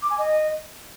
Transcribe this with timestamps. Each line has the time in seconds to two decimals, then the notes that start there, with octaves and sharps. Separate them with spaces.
0.02 D6
0.10 G#5
0.18 D#5